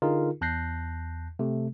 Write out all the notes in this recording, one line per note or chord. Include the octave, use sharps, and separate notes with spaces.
D3 D#4 F4 G#4 A#4
E2 A5 F#6 G6 A#6 C7
C3 A3